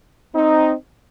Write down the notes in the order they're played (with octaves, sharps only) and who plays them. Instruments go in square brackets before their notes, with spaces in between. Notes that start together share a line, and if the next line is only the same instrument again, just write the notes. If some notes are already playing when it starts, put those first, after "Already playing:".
[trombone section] C4 D#4